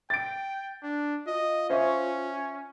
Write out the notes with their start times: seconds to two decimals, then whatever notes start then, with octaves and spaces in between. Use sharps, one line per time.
0.10 G5 A6 D7
0.83 D4
1.27 F4 D#5
1.70 C#4 C5 E5 C#6